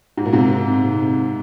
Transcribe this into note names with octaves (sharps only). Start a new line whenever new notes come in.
G#2
A#2
G#2 C3